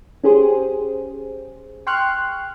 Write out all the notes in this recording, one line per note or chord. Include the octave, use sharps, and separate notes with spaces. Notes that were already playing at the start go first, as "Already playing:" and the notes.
C#4 G4 G#4 C5
G5 C6 C#6 F6 F#6